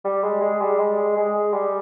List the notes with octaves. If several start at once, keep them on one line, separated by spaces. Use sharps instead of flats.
G3
G#3
G#3
G3
G#3
G#3
G3